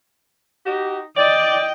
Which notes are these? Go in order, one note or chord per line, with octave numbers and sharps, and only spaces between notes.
D#4 F#4 G4
D5 D#5 G5